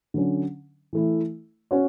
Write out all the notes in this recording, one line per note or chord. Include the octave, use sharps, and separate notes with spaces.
D3 F#3 C#4
E3 A3 E4
C#4 F#4 C#5